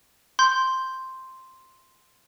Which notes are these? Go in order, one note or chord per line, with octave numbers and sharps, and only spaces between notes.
C6 G6